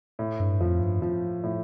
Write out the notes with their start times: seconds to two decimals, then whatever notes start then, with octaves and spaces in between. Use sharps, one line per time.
0.19 A2
0.40 G2
0.61 F2 F3
0.81 G2
1.02 F3
1.43 A2